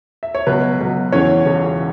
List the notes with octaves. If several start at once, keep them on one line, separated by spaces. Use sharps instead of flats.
E5
C#5
C#2 B2 F#3 B4
C#2 B2 F#3
E1 E2 C#3 E3 C#4 C#5
E1 E2 C#3 E3